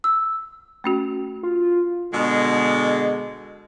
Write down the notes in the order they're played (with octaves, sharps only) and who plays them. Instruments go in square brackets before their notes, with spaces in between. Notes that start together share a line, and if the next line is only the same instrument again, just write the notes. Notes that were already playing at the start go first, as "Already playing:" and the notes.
[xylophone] E6
[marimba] A3 C#4 F#4
[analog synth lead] F4
[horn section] B2 D3 G#3